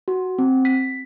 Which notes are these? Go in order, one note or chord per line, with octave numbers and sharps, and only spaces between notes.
F#4
C4
B6